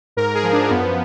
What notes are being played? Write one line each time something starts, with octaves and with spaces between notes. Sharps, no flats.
G#2 A#4
G#4
F3
D4
F#2 B3